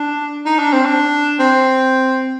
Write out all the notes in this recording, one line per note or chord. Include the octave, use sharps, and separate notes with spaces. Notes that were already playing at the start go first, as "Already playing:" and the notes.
Already playing: D4
D#4
D4
C4
D4
C4